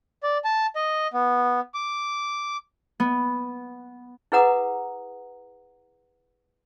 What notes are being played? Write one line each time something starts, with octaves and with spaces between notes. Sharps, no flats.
D5
A5
D#5
B3
D6
B3
E4 G#4 B4 F#5 A#5 D#6